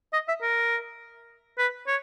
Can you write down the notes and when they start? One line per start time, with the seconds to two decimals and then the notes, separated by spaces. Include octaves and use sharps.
0.13 D#5
0.28 E5
0.42 A#4
1.58 B4
1.87 C#5